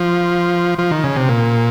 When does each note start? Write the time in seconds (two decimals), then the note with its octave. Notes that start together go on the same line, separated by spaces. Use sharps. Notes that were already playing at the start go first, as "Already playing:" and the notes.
Already playing: F3
0.78 F3
0.91 D#3
1.04 C#3
1.16 C3
1.29 A#2